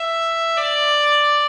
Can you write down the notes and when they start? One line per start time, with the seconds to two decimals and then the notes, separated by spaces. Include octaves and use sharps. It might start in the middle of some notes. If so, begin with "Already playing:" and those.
Already playing: E5
0.58 D5